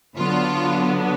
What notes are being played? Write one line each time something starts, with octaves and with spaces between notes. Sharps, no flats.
D3 F#3 B3 D4 F4